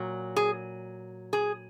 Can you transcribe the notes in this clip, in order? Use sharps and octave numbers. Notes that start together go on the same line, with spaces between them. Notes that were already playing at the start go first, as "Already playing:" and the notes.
Already playing: A#2 F#3
G#4
G#4